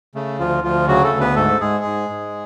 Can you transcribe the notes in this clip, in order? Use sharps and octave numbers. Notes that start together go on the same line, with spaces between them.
C#3 A3
D2 F3 F4
D2 F3 F4
C#3 F#3 F#4
A3 A4
D2
B3 B4
G#2 A3 A4
G#2 G#3 G#4
G#2
G#2